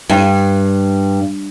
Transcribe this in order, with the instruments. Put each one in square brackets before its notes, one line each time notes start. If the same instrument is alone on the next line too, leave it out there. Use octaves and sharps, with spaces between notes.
[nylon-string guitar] G2